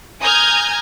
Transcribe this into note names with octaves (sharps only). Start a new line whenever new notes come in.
G#5 A#5 D#6 F6 G6 G#6